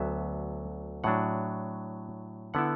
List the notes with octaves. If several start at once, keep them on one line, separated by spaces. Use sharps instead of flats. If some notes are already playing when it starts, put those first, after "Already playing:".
Already playing: D2 D3 F#3 B3 E5
A2 F#3 D4 F#5
D3 B3 E4 F#5